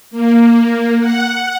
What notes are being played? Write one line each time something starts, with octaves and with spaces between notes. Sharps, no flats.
A#3
F#5